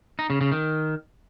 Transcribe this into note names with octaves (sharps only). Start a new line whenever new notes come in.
D#4
C#3
C#3
D#3